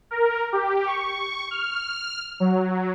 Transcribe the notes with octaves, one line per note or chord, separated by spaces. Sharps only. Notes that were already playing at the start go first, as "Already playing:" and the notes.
A#4
G4
C#6
F6
F#3